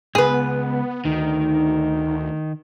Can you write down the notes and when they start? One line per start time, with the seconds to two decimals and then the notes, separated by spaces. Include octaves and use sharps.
0.15 C#2 G#2 B3 G#4 B4
1.05 D2 D#3 D#4